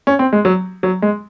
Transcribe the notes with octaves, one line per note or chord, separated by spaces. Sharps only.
C#4
C4
G#3
F#3
F#3
G#3